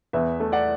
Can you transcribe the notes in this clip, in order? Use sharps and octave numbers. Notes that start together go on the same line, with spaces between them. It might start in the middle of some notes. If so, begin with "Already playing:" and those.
E2 B4 E5
A3
D5 F#5